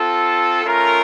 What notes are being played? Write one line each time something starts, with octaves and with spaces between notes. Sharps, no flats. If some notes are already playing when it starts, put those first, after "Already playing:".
Already playing: C4 F4 A4
A3 C#4 F4 A#4